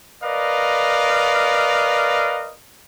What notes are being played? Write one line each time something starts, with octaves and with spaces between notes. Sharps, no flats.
A#4 B4 D5 D#5 F5